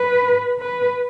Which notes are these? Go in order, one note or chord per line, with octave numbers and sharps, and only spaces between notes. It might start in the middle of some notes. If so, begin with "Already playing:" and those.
Already playing: B4
B4